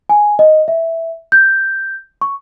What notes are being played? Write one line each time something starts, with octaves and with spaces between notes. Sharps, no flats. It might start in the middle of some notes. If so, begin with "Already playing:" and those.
G#5
D#5
E5
G6
C#6